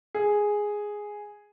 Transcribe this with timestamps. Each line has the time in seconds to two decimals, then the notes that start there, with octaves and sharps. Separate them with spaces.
0.14 G#4